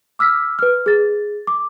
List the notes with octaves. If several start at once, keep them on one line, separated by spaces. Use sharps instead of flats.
D6 E6 F6 B6
B4 F6
G#4 A6
D6